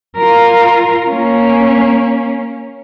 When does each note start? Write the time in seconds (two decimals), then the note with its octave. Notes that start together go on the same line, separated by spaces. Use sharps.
0.16 F4 A#4
1.10 A#3 C#4